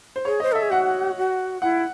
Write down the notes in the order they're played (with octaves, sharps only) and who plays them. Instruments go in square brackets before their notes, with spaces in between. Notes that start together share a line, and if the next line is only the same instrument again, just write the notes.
[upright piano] C5
[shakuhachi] G#4 [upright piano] C#5
[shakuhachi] C5 [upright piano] D#5
[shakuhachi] A4 [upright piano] E5
[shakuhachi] G#4
[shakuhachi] F#4 [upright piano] F#5
[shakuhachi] F#4
[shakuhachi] E4 [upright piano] F#5